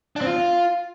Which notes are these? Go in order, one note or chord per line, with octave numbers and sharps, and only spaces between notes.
D4
C4
F4